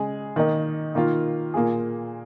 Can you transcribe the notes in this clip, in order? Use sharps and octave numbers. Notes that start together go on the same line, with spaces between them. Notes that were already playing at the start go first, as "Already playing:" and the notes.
Already playing: C#3 G#3 G#4
D#3 A#3 D#4
D#3 A#3 F4
A#2 A#3 F4 G#4